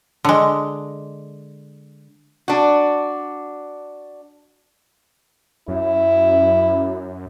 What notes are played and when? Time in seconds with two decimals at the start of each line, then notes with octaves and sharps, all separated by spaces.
0.25 D3 G#3
2.48 D4 F#4
5.68 F#2 E4